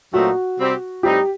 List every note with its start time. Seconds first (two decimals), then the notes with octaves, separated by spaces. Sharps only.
0.13 A#2 F#3 A3 C4 D#4 F#4
0.59 C3 G3 C4 G4
1.03 A2 G3 C4 D#4 G4